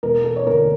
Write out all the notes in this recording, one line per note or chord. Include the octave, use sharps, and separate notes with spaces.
E1 A#4
A4
C#5
D2 D3 A#4